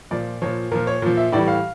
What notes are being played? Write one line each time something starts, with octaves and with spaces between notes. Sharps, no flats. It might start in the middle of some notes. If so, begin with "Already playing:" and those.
A#2 F3 D5
A#2 F3 C#5
A#2 F3 A#4
C#5
A#2 F3
E5
A2 E3 G3 D5
F5